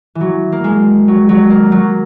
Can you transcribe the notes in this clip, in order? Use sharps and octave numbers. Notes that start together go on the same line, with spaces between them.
E3
F#3
A#3
G#3
F#3
F#3
A#3
F#3